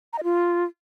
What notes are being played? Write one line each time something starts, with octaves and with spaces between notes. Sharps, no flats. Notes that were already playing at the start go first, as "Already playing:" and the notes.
A#5
D#5
F4